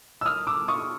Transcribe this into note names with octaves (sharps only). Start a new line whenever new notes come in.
E6
D#6 F6
D6 E6
C#6 D#6